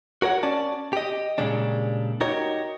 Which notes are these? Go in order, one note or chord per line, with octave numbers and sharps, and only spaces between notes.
F#4 A#4 C#5 F#5
C#4 D5 A5
G4 D#5
A#2 C#3 G3 G#3 D4
D#4 F#4 G4 A#4 C#5 D#5